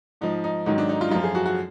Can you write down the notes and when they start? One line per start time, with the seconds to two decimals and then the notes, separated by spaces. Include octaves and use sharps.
0.21 G#2 F3 D#4
0.44 D#4
0.66 G#2 D#3 F#3 D#4
0.78 D4
0.89 D#4
1.01 F4
1.08 D#4
1.11 F#2 F3 F4
1.24 G#4
1.35 F#4
1.46 F#4